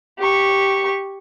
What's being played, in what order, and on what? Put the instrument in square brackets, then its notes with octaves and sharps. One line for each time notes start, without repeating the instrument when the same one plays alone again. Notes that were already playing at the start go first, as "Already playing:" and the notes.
[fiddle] G4 C#6